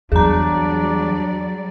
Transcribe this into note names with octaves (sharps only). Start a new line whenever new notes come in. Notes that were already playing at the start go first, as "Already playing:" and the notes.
E2 F#3 G3 D4 G#4 D5 A#5